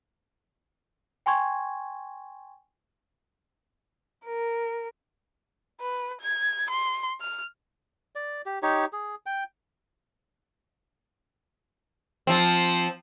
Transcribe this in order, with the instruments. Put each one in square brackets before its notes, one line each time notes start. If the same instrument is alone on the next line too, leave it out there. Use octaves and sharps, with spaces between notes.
[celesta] G5 G#5 C6 C#6 G#6
[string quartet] A#4
[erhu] B4
G#6
C6
F6
[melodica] D5
G4
D#4 G4 C#5
G#4
G5
[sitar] F3 C4